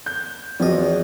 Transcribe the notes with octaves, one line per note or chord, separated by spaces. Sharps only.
G6
E2 F3 C4 F#4 D#5